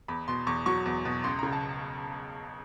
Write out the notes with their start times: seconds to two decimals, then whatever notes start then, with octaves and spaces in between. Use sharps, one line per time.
0.08 E2 B5
0.28 B2 C6
0.47 E2 C#6
0.66 F#3 C#6
0.86 E2
1.05 B2
1.24 C#2 C6
1.39 C#3 A#5
1.52 A5